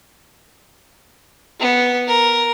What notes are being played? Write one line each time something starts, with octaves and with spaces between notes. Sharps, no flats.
B3
A#4